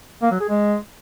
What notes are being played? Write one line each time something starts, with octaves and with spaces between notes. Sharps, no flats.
A#3
F#3
G#4
G#3